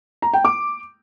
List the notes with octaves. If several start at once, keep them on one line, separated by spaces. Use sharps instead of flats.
A#5
G5
D6